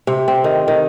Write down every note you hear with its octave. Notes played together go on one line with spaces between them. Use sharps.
C3
C4
D#3
D#3